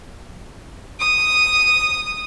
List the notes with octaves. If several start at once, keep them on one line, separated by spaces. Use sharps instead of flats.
D#6